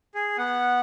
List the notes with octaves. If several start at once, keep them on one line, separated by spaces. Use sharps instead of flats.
G#4
B3 F#5